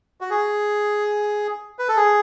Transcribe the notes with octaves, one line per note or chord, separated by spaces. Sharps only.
F#4
G#4
B4
A4
G#4